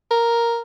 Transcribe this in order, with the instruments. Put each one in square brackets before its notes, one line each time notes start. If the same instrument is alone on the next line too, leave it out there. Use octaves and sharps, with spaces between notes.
[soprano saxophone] A#4